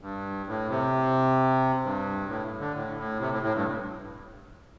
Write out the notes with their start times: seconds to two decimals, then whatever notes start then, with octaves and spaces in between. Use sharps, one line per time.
0.01 G2
0.47 A2
0.69 C3
1.83 G2
2.29 A2
2.59 D3
2.74 A2
2.97 A2
3.20 C3
3.31 A2
3.43 A2
3.54 G2